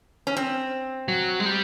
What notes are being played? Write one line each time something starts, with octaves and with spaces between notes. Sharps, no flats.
C#4
C4
F#3
G#3
G3